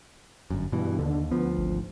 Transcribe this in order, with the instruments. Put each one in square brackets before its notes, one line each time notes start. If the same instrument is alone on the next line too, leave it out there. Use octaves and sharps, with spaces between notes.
[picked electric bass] G1 F#2
[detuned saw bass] G2 [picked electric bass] B2 E3
[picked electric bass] D#2 [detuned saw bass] D3
[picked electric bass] D2 F3 [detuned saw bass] B3
[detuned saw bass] G#1